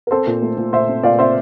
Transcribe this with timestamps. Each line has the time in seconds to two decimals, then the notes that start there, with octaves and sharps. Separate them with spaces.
0.07 A#4
0.11 C4 A4 C5
0.27 A#2
0.42 A3
0.57 A#2
0.73 A#2 C5 E5
0.89 C4
1.03 A#2 D5 F5
1.19 C4 C5 E5